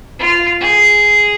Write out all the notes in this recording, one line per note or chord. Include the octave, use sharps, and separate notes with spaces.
F4
G#4